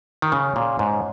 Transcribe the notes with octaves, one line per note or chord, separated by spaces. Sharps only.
D#3
C#3 C#4
A#2 F4 G#4
G#2 C#4